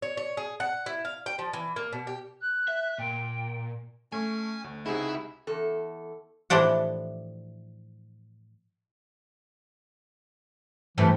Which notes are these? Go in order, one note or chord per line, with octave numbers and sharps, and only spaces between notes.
C#5
C#5
G#4
F#5
E4
F5
G5
F3
E3
A#3
B2
G4
F#6
E5
A#2 G5
A3 C#4 G#5 C#6
D2
C#2 C3 D#4 E4 F#4 G#4 E5
E2 A4
A2 E3 F3 D4 G4 F#5
G2 C3 E3 A3